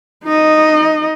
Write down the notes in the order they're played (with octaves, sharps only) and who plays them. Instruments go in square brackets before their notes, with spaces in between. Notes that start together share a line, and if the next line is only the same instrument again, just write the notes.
[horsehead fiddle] D#4 D#5